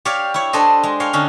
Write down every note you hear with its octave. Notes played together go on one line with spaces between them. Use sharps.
G4 C#5 D5 F5
E4 C#5
D4 A4 C5 D#5
G#3
C#5 F5 G5
D3 C#4 D#4